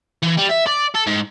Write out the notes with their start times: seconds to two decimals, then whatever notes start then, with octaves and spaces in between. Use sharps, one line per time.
0.23 E3
0.39 G3
0.51 E5
0.67 D5
0.95 A4
1.07 G#2